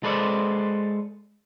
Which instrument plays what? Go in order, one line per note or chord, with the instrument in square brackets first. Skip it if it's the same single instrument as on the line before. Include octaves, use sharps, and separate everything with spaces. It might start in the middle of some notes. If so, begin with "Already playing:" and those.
[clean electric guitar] G#3 A4 B4 C5 D5